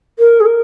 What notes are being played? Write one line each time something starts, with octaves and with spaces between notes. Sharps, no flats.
A#4
G#4
A#4